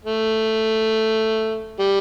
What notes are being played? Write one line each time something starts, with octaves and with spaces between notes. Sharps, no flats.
A3
G3